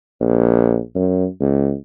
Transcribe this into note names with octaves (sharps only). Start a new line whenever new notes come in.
A#1
F#2
C#2